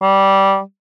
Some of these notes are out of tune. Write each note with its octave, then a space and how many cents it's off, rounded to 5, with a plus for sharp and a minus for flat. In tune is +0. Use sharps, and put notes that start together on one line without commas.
G3 -10